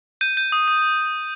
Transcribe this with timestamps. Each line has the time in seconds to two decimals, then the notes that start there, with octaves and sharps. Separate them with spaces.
0.21 G6 D#7
0.37 G6
0.52 D#6
0.68 D#6